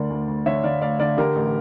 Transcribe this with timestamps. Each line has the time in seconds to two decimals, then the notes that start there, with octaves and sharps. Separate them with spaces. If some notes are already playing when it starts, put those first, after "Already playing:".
Already playing: D2 D3 A#4 D5
0.10 D2
0.28 D2
0.46 D3 C#5 E5
0.64 D3 D5 F5
0.82 D2 D5 F5
1.00 D3 D5 F5
1.17 D3 G4 A#4
1.35 A1